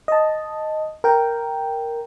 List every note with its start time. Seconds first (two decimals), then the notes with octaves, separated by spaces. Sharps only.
0.08 D#5 A5
1.04 A#4 G5